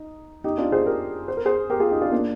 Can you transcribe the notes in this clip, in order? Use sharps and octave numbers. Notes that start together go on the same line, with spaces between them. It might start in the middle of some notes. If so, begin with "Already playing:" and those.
Already playing: D#4
D#4 G4
D4 F4
G#4 C5
G4 A#4
C5
A#4
G#4 C5
G4 A#4
F4 G#4
D#4 G4
D4 F4
A#3 D4